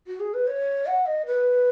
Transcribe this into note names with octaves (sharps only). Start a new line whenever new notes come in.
F#4
G#4
B4
C#5
F#5
D#5
B4